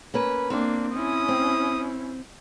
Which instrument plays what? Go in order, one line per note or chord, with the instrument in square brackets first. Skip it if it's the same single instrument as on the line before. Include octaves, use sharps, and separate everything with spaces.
[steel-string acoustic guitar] A#3 C#4 B4
[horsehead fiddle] A#3 D4 [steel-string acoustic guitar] C4
[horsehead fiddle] C#4 E4 [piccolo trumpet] D#6
[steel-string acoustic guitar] C4